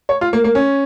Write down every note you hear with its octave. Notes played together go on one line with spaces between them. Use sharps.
C#5
F4
A#3
A#3
C#4